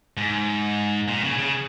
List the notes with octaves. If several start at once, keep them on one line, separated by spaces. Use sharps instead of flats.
G#2
A#2
C#3
C#3